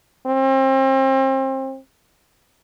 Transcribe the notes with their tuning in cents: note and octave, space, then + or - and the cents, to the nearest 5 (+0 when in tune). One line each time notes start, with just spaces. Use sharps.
C4 +35